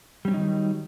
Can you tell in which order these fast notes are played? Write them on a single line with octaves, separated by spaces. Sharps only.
G3 C#4 F#3 D#4 D#3